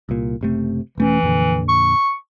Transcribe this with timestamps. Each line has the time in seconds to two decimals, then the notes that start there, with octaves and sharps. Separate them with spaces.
0.09 C2 A#2
0.41 F#1 C3 A3
0.98 E1 E3 A3 C#4
1.23 F2 A#2 D3
1.69 C#6